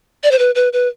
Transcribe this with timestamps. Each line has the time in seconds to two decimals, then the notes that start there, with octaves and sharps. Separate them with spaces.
0.24 D5
0.31 C5
0.39 B4
0.55 B4
0.73 B4